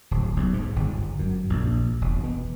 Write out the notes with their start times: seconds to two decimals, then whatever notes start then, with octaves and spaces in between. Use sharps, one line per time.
0.11 D1
0.36 B1
0.53 G#2
0.76 G1
1.19 F#2
1.50 A#1
2.01 E1
2.24 B2